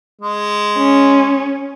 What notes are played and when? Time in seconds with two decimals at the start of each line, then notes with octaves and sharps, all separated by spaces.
0.21 G#3
0.78 C#4